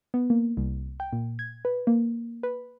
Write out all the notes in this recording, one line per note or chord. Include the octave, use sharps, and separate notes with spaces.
B3
A#3
C2
G5
A#2
G#6
B4
A#3
B4